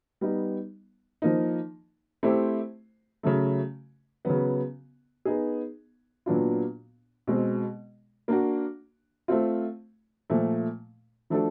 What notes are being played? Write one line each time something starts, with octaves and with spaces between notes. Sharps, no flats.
G3 B3 D#4
F3 A#3 D#4
A3 C4 E4 G4 C5
C#3 F#3 A3
C#3 F#3 B3
B3 D#4 G#4
A#2 F#3 B3 D4 F4
B2 G#3 C4
A#3 D4 F#4
A3 C4 F4
A#2 F3 A3
F3 A3 D4 F#4 A4